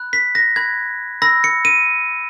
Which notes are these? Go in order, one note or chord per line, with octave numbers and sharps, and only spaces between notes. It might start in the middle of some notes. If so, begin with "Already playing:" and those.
Already playing: B5 F#6
B6
A#6
B5 F#6 G#6
B5 E6 A#6
C#7
D#7